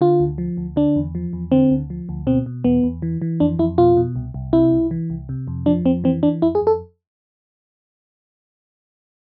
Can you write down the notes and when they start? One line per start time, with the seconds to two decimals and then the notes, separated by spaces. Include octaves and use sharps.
0.01 D3 F4
0.20 D2
0.38 F3
0.57 D2
0.76 D3 D4
0.96 E2
1.15 F3
1.33 E2
1.52 D3 C4
1.70 D2
1.90 F3
2.09 D2
2.27 B2 C4
2.46 B2
2.64 E2 B3
2.83 E2
3.02 E3
3.22 E3
3.40 F2 D4
3.59 F2 E4
3.78 B2 F4
3.97 B2
4.16 C2
4.34 C2
4.53 C3 E4
4.72 C2
4.91 E3
5.10 C2
5.29 C3
5.47 F2
5.66 F3 D4
5.85 F2 C4
6.04 E3 C4
6.23 E3 D4
6.42 F2 E4
6.55 G#4
6.61 F2
6.67 A4